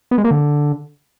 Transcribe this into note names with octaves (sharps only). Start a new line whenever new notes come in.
B3
G#3
A#3
D3